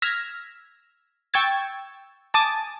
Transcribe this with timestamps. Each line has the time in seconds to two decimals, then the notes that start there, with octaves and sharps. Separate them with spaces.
0.02 E6 F6 G#6 A#6 B6
1.34 G5 C#6 E6 G#6 A6
2.34 G#5 A5 D6 D#6 A6